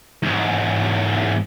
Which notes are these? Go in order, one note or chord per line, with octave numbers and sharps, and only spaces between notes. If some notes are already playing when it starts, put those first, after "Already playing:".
E2 G#2